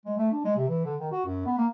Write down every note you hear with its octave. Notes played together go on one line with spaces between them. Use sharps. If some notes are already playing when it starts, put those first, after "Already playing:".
G#3
A3
D4
G#3
C3
E3
D3
D#3
F#4
F#2
B3
A#3